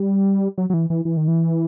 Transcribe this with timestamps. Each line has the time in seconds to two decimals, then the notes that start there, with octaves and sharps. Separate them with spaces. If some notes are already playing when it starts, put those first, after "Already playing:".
Already playing: G3
0.58 F#3
0.70 F#3
0.74 E3
0.90 E3
1.05 E3
1.17 D#3
1.28 E3